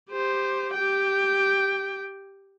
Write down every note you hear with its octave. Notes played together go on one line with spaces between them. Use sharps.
G4 C5
G4 G5